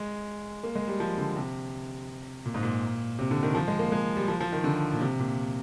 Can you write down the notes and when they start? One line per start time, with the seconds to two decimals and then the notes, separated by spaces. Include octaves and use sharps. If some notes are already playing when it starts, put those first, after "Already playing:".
Already playing: G#3
0.64 A#3
0.76 G#3
0.88 G3
1.00 F3
1.18 D3
1.36 C3
2.46 A#2
2.54 G#2
2.63 A#2
3.19 C3
3.31 D3
3.43 D#3
3.55 F3
3.68 G#3
3.79 A#3
3.92 G#3
4.17 G3
4.28 F3
4.40 F3
4.53 D#3
4.64 D3
4.93 A#2
5.01 C3
5.19 A#2